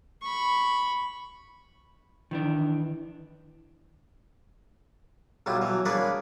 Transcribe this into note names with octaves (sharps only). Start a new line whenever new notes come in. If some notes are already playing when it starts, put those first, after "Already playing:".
B5 C#6
D#3 E3 D4
B1 F#3 G3 E4 F4
B2 E3 F#3
A#3 D4 G#4 B4 C#5 D5